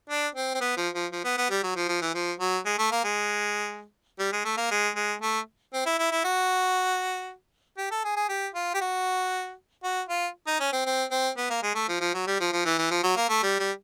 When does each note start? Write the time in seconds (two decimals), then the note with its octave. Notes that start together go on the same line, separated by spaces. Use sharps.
0.10 D4
0.35 C4
0.55 C4
0.61 B3
0.77 F3
0.94 F3
1.12 F3
1.25 B3
1.38 B3
1.50 G3
1.63 F#3
1.76 F3
1.89 F3
2.02 E3
2.14 F3
2.40 F#3
2.66 G#3
2.79 A3
2.92 A#3
3.04 G#3
4.19 G3
4.33 G#3
4.45 A3
4.57 A#3
4.71 G#3
4.96 G#3
5.22 A3
5.73 C4
5.86 E4
5.99 E4
6.12 E4
6.24 F#4
7.78 G4
7.91 A4
8.05 G#4
8.16 G#4
8.29 G4
8.55 F4
8.75 G4
8.81 F#4
9.84 F#4
10.09 F4
10.47 D#4
10.60 C#4
10.73 C4
10.86 C4
11.11 C4
11.37 B3
11.50 A#3
11.63 G#3
11.75 A3
11.89 F3
12.01 F3
12.14 F#3
12.27 G3
12.40 F3
12.53 F3
12.65 E3
12.79 E3
12.91 F3
13.04 F#3
13.16 A#3
13.29 A3
13.43 G3
13.60 G3